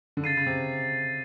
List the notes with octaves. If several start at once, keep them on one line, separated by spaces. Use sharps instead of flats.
D3
C#3 A6 C7 D#7
C#3
C3